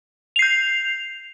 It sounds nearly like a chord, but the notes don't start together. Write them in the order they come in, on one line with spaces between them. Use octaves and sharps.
F7 C7 G6